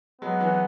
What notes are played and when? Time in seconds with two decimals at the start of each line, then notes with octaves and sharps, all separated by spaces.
0.21 F#3 G#3 B3
0.40 E3 F#3